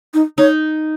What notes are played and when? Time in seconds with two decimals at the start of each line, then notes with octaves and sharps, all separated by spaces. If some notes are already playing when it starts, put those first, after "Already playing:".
0.14 D#4
0.38 D#4 C#5